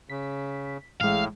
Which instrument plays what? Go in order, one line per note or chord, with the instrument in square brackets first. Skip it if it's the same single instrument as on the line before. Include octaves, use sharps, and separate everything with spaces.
[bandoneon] C#3 [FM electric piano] B6
[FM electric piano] A1 G#3 [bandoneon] A2 [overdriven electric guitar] F5